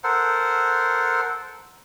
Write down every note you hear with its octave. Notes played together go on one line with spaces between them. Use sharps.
A4 A#4 C5 F#5